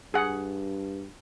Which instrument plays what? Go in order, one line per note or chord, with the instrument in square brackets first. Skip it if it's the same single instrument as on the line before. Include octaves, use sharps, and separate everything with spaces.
[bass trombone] G2 [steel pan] G#4 F#5